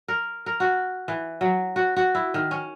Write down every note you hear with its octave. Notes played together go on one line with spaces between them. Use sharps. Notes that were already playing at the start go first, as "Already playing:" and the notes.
A#4
A#4
F#4
E3
F#3
F#4
F#4
E4
D#3
C#4